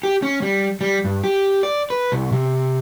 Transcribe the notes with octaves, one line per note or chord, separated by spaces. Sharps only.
G4
C#4
G3
G3
G2
G4
D5
B4
C2
C3